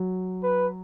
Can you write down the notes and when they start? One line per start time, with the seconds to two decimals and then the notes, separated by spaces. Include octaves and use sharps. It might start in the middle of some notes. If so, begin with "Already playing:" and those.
Already playing: F#3
0.43 B4